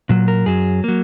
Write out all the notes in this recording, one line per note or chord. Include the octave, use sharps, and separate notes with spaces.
A#2 F#3
A#4
F#2 F#3 G#4
F#3 A#3